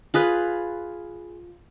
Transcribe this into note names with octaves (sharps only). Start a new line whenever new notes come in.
F4 G#4 B4